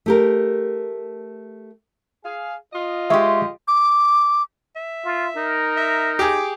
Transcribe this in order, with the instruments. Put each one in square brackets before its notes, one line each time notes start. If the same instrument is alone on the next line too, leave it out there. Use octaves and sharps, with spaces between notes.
[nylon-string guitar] A3 G4 A#4
[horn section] G#4 F5
F4 D#5
[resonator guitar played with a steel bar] G#3 G4 [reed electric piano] E5 C#6
[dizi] D6
[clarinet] E5
[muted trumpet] F4
[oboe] D#4 [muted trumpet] A#4
[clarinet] E5
[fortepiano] G4 G#4 [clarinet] D6